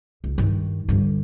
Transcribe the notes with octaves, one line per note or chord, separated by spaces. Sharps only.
C#2
G2 D#3
G2 D3